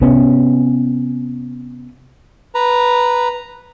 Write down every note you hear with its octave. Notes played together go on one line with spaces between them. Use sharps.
C3 B3 C#4
B4 A#5